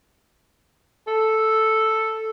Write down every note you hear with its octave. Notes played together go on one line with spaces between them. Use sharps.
A4